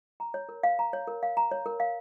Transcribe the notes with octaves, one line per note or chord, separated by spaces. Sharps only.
A#5
C#5
A#4
F5
A#5
C#5
A#4
F5
A#5
C#5
A#4
F5